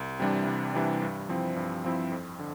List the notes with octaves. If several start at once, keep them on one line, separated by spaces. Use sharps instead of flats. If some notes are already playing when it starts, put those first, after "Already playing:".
Already playing: C2
C3 E3 G3 D4
C2
C3 E3 G3 D4
G2
F3 C4 E4
G2
F3 C4 E4
F2
D3